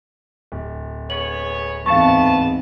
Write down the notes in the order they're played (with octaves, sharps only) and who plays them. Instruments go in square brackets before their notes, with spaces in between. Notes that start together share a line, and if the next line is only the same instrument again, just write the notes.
[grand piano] D1
[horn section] B3 G#4 C#5 [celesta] F#7
[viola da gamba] E2 G#2 C4 [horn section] B3 A5 [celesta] F5 C#6